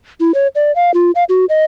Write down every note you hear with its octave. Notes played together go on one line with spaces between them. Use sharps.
E4
C#5
D5
F5
F4
F5
F#4
D#5